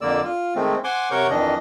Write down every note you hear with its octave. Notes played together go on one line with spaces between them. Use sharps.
F2 D3 A#3 D5 E6
F4
D#3 G#3 A3 C4
C5 F#5 G#5 C6 D6
C3 A#4 C#5 F#5 C#6 G6
F2 D#3 E3 D4 D#5